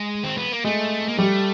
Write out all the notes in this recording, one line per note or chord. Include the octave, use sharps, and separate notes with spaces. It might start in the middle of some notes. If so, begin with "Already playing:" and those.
Already playing: G#3
C4
B3
A#3
G#3 A3
A#3
G3 A3